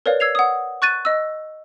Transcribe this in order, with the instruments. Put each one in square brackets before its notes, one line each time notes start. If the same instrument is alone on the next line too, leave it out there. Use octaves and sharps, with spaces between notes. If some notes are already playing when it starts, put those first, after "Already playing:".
[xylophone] A#4 B4 C#5 D5 F5
E6 G#6 C7 F7
F#5 D#6
C#6 F#6 A6 D#7
D#5 E6